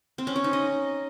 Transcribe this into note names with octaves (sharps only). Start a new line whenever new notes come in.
C4
C#4
C#5
D#4
D#5